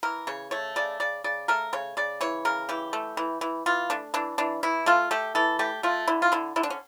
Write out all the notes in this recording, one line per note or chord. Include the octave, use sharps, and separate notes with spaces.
E3 A#4
C#3 C#5
A3 C#5
C#3 D5
C#3 D5
C#3 D5
A3 A#4
C#3 C#5
C#3 D5
E3 C#5
C#3 A#4
E3 G4
A3
E3
E3
E3 F4
A3 D4
E3 D4
E3 D4
E3 E4
A3 F4
A3 G4
E3 A4
A3 G4
A3 F4
D3 E4
F4
D3 E4
D3 E4
D4
C#4